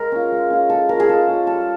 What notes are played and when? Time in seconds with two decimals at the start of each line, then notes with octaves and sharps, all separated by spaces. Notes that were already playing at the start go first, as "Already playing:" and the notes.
Already playing: G#3 A#4
0.12 C#4 F4
0.32 G#3
0.50 C#4 F4
0.70 G#3 A4
0.89 C#4 F4 A#4
1.00 G#4
1.09 G#3 A4
1.28 C#4 F4
1.47 G3 A4